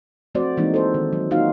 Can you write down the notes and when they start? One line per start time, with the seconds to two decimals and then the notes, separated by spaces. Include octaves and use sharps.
0.35 F3 A3 C4 F#4 C5 D5
0.57 E3 G#3 A#3 C4 D#4
0.74 A4 C5
0.94 D#3
1.13 F#3
1.31 A#3 D#4 F4 F#4 F5